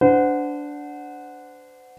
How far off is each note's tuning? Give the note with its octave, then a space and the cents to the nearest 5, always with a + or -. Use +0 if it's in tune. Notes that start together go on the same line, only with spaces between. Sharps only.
D4 -10 C5 -35 F#5 -5